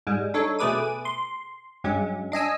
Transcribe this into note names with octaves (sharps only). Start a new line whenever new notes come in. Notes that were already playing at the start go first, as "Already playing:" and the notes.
G#2 G3 G#3
D4 D#4 A4 C#5
B2 A3 G#4 B4 D6 D#7
C6
G2 F#3 G#3 C#4
D4 D#5 G#5 E6